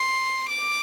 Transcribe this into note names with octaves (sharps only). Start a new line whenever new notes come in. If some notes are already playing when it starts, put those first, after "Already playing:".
Already playing: C6
D6